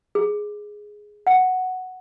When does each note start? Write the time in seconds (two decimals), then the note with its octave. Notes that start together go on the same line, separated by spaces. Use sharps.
0.15 G#4
1.27 F#5